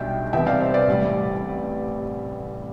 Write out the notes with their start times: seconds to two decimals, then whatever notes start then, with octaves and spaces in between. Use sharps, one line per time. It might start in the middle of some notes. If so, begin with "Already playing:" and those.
Already playing: B1 B2 G3 D4 E5 G5
0.33 C2 C3 E3 B3 E5 G5
0.46 D5 F5
0.60 C5 E5
0.74 B4 D5
0.87 A1 A2 G3